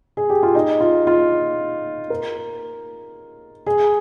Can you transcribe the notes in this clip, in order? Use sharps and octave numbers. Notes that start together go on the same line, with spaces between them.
G#4
G4
F4
D#4
F4
F4
A#4
G#4